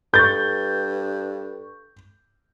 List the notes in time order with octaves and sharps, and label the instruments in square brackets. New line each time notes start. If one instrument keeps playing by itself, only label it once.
[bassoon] G2 [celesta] A4 C#6 [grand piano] G6 A6